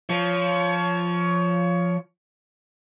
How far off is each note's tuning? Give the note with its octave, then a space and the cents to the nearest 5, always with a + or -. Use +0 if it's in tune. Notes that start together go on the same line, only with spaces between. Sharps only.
F3 +0 C#5 +20